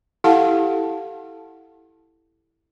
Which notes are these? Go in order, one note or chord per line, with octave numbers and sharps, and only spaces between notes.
E4 G4 A4 F5 F#5 A5